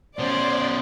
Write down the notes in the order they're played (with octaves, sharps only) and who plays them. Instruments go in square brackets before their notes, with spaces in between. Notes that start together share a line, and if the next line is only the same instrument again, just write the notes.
[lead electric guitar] B2 C#4 [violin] C5 [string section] D5